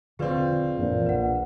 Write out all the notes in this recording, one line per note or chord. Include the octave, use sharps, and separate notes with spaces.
E1 D3 F3 C4 F4 G#4 B4 D5
A#1 F#2 E3 F3
B1 B4 F#5